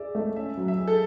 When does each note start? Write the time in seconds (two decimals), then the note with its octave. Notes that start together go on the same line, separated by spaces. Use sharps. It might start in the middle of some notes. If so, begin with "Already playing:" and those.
Already playing: G#4 D5 E5
0.15 A3
0.36 C#4 E5
0.57 F#3
0.68 E5
0.78 G#4
0.88 A4